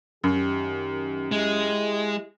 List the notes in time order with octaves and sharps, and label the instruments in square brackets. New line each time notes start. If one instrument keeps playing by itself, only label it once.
[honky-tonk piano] F#2 [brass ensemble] D#3 G4
[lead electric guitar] G#3 [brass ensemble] E4 G4 D#5